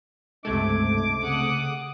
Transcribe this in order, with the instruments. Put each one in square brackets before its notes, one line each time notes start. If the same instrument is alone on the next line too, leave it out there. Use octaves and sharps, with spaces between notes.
[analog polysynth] C#2 C3 A3 [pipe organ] G2 G#3 G#6 [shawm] D6
[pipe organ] C#3 [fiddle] F#5 D#6